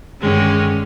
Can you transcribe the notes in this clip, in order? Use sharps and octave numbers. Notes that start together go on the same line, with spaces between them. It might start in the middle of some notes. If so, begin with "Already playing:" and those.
G2 D3 D#3 G#3 C#4 G4